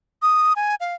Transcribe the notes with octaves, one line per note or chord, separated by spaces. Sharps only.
D#6
G#5
F5